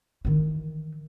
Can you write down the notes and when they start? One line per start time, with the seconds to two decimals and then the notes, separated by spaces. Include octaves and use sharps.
0.25 D#3 E3